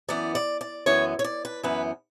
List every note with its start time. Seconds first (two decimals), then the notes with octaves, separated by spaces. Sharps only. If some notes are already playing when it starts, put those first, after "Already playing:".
0.08 F#2 E3 B3 D5
0.35 D5
0.61 D5
0.86 F#2 E3 B3 C#5
1.19 C#5
1.24 D5
1.45 B4
1.63 F#2 E3 B3 B4